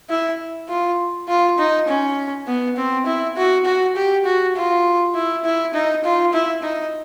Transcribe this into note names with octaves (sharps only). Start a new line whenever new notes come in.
E4
F4
F4
D#4
C#4
B3
C4
E4
F#4
F#4
G4
F#4
F4
E4
E4
D#4
F4
E4
D#4